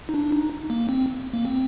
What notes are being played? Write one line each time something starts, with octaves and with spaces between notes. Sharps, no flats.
D#4
D4
D#4
A#3
C4
A#3
C4